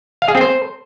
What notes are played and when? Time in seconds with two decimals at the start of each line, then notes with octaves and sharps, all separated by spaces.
0.22 F5
0.28 G#4
0.35 C4
0.41 C5